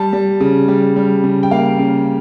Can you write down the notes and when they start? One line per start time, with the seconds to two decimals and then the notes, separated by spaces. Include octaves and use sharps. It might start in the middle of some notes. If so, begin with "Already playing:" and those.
Already playing: G3 A5
0.13 G3
0.40 C#3
0.68 G3
0.96 G3
1.24 C#3
1.43 G5
1.51 A#3 F5
1.79 C#3